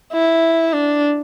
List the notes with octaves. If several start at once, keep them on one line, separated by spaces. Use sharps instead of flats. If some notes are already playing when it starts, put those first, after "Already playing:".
E4
D4